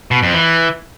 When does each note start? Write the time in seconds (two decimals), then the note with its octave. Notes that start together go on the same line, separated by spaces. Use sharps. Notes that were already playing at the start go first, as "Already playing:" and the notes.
0.11 B2
0.23 F2
0.34 E3